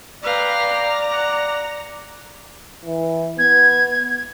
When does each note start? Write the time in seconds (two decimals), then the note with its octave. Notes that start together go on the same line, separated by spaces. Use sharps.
0.23 B4 D5 F5 G5 A#5
0.71 A#5
1.10 F#5
2.85 E3
3.39 B3 G#6